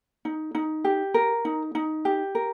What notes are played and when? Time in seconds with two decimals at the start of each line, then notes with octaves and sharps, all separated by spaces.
0.25 D#4
0.55 D#4
0.84 G4
1.14 A#4
1.45 D#4
1.75 D#4
2.05 G4
2.35 A#4